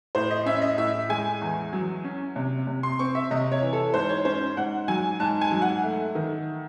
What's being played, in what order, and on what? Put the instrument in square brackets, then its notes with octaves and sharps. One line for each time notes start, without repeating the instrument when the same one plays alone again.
[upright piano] A2 C5
D#5
C#4 E5
D#5
A2 E5
G#3 G#5
E2
F#3
C#4
C3
C3
C6
C4 C#6
E5
C3 D#5
C#5
E3
A4
G#2 C5
C#5
C#4 C5
G#2 F#5
F#3 G#5
G#2 A5
G#5
F#3
F#5
A3
D#3